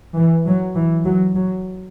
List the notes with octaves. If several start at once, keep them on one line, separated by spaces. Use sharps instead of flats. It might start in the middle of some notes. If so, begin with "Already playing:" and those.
E3
F#3
E3
F#3
F#3